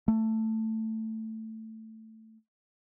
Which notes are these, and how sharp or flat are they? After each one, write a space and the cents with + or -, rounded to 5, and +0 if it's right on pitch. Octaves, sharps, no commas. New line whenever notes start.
A3 +10